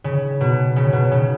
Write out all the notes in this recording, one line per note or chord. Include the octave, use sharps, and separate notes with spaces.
C#3
B2
C#3
B2
C#3